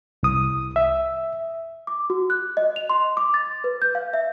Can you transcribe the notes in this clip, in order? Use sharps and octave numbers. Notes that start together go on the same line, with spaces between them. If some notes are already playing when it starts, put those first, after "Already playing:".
C2 D#6
E5
D6
F#4
F#6
D#5
F7
C6
D6
A6
B4
G6
F5
E5